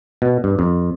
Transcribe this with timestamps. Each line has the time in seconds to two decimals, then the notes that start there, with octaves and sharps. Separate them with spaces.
0.22 B2
0.44 G2
0.59 F2